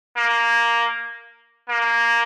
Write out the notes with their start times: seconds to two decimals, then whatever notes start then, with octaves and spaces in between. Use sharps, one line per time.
0.17 A#3
1.69 A#3